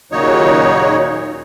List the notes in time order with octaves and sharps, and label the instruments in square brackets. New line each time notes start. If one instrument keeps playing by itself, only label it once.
[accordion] D#2 A#2 C#3 F#3 D#4 C#5